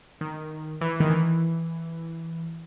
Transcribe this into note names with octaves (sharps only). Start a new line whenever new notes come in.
D#3
E3
D#3
E3